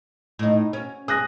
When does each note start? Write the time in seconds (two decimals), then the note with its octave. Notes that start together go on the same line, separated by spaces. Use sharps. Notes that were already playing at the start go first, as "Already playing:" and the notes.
0.39 A2 D#4
0.73 C#4 F#4
1.08 G#4 D#6 F#6 A#6